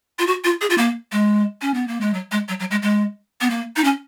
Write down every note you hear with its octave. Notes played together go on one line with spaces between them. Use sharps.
F4
F#4
F4
G#4
F4
A#3
G#3
C#4
B3
A#3
G#3
F#3
G#3
F#3
F#3
G#3
G#3
B3
A#3
D#4
C#4